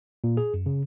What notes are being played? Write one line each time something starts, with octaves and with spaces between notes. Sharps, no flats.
A#2
G#4
F#2
C#3